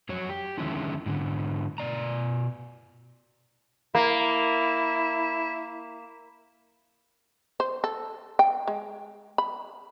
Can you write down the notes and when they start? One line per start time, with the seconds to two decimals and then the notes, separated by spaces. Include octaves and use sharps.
0.09 F2 F#3 C#5
0.29 G4
0.58 D3 D#3 F3 G#3 C#4 E4
1.06 G#2 D3
1.78 B2 D5 A#5
3.95 A#3 E4
7.60 C5
7.84 A4
8.39 G5
8.68 G#3
9.38 B5